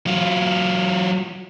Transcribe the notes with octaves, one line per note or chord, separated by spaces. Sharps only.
F#3 F4